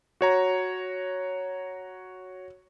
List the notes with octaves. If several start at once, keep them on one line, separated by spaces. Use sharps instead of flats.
F#4 C#5 A#5